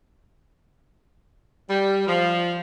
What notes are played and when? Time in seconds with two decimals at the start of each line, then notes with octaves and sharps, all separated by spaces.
1.70 G3
2.07 F3